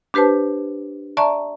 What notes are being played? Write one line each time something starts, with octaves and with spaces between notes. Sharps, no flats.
D4 G4 B4 C5 A5
D5 E5 A5 A#5 C#6